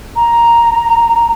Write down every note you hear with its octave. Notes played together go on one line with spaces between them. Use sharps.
A#5